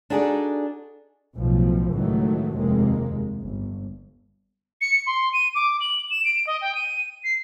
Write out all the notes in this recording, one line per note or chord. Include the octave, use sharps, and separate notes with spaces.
D4 D#4 F#4 G#4 A4 D5
B1 A2 F3
C#2 A2 D#3 E3 F#3 A3
F1 D#2 C3 G#3 A#3
G1
C#7
C6
D#7
D6
F#7
E7
D7
D#5
G5
D#7
C7